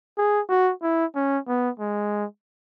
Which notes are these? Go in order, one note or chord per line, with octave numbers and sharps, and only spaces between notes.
G#4
F#4
E4
C#4
B3
G#3